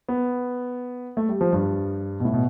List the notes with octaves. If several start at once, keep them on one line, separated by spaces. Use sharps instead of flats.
B3
A3
G3
F3
G2
B2
A2
B2